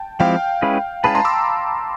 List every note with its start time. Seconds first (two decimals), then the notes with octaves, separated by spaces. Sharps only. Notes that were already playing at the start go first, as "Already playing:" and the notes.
Already playing: G5 A5
0.20 F3 G#3 C4 E4 G4 F5 G5
0.62 G#3 C#4 E4 G#4 B4
1.04 G#3 C#4 E4 G#4 B4 A5 B5
1.15 A#5 C6
1.25 D6 E6